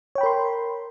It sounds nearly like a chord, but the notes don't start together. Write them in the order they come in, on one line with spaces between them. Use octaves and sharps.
C#5 G5 B5 A#4 C6